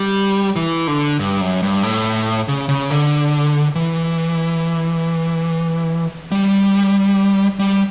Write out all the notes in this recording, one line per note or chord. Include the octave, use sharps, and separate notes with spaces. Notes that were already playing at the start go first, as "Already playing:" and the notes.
Already playing: G3
E3
D3
G2
F#2
G2
A2
C#3
C#3
D3
E3
G3
G3